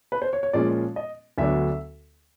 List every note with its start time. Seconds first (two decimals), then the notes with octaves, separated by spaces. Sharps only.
0.12 B4
0.22 C5
0.33 C#5
0.43 C#5
0.53 A#2 F3 G#3 C#4 D5
0.96 D#5
1.38 D2 D3 F#3 B3 D4 E5